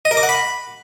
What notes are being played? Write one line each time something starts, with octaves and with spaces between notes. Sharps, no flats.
D#5
A#4
D6
F#5
B5